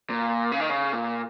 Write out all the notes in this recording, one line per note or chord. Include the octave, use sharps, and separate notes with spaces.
A#2
C#3
D#3
C#3
A#2